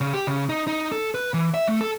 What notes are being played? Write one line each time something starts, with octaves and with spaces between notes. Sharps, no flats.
C#3
G4
C#3
D#4
D#4
A4
B4
E3
E5
A3
A4